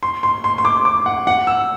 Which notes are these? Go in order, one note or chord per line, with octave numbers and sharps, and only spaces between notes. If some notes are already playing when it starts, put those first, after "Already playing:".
C6
C6
C6
C6
D6
D6
F#5
F#5
E6